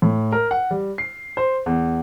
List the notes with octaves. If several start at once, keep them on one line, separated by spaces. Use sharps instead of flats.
A2
A#4
F#5
G3
C7
C5
E2